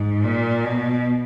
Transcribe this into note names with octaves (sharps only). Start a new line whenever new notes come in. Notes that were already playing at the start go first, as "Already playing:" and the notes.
Already playing: G#2
A#2
B2